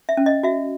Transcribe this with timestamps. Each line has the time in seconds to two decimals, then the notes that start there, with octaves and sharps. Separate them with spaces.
0.09 E5
0.17 C#4
0.26 D#5
0.43 F#4 E5